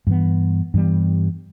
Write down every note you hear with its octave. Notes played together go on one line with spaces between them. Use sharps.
G2 E3 B3
G2 E3 G3 B3